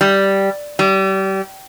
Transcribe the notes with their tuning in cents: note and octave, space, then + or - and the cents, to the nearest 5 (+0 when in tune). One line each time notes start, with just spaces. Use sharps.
G3 -5
G3 -30